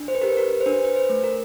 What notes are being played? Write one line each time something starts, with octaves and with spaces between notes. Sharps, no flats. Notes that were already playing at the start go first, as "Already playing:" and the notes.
Already playing: D4
C5
B4
G4 A#4
B4
A#4
C5
D4 B4
B4
C5
A3
A#4